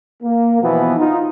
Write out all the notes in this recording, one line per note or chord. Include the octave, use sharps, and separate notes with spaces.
A#3
B2 E3 F3 B3
D#4 F4